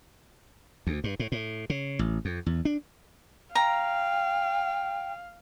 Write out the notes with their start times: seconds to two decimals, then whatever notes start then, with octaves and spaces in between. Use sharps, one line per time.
0.87 D2
1.04 G2
1.19 A2
1.32 A2
1.70 C#3
1.99 A1
2.25 F2
2.46 E2
2.65 D4
3.55 F5 G5 A#5